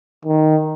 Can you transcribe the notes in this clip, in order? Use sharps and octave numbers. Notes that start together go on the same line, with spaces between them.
D#3